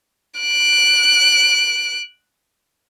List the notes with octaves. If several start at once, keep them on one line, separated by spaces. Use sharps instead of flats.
F#6 D7